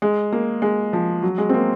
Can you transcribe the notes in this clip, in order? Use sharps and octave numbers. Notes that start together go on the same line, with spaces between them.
G#3
A#3
G#3
F3
F#3
G#3
C4
A#3